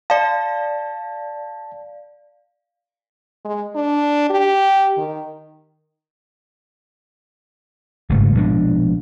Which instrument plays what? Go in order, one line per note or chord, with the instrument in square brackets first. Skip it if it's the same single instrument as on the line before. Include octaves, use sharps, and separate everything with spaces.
[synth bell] D5 F5 [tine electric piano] A5
[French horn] G#3
D4
G4
D#3
[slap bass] G1 G#2 C#3 A3
A#1 B2 G#3 D4